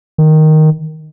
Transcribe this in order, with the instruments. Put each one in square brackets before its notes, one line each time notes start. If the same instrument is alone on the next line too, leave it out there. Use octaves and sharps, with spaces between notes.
[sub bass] D#3